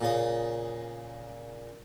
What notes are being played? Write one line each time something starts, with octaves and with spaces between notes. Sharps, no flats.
A#2 C#3 D#6